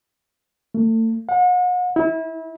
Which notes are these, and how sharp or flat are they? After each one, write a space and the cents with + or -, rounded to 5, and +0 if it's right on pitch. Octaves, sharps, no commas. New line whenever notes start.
A3 +35
F#5 -40
E4 -30